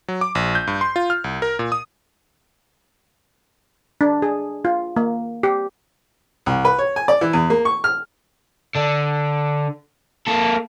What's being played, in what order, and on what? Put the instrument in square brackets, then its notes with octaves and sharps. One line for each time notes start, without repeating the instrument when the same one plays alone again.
[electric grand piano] F#3
D6
A#1
G6
G2
C6
F4
F6
C2
A#4
A#2
D#6
[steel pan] D4
G#4
F4
A#3
G4
[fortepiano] C2
B4
C#5
G#5
D5
E3
E2
A#3
C#6
F6
[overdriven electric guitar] D3 D4
A#3 A4